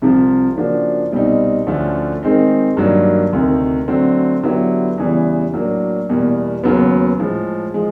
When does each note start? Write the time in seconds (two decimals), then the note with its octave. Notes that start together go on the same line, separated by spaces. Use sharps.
0.02 C2 C3 F3
0.56 C#3 F3 A#3 D4 F#4
1.12 C2 B2 G3 C4 D#4
1.67 D2 D3 F3 A3 C#4
2.23 D#3 G#3 C4 D#4
2.77 G2 D#3 F#3 A#3 D4
3.33 D2 C3 D#3
3.88 D3 F#3 A3 C4
4.43 D3 F#3 B3 E4 G4
4.98 E2 C#3 E3 G3
5.54 A2 F#3 A#3 D4
6.09 E2 B2 G3 A#3
6.64 D#2 C#3 F#3 B3
7.19 A2 F3 G#3
7.74 F3 G#3